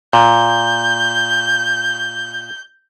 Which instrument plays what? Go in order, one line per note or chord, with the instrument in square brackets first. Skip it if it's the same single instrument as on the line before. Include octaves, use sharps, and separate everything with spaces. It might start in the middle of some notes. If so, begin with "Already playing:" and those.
[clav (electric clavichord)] A#2 [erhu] G6